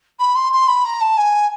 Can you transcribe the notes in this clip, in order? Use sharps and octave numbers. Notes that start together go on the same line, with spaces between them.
B5
C6
C6
B5
A#5
A5
G#5